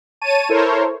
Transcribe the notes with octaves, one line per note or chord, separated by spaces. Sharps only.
C#5 A5 D#7
E4 A4 A#4 C5 C#5